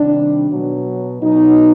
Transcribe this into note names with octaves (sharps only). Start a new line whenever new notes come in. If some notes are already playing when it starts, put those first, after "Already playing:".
Already playing: C3 D#3 G3 D4
B2 F#3
B2 F#3 D#4